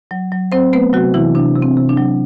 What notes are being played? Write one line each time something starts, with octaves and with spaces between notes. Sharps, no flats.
F#3
F#3
F#3 C4 C5
A3 B3 B4
C3 F#3 F#4
C3 E3 E4
C3 D4
C3
C4
C3
D4
F#3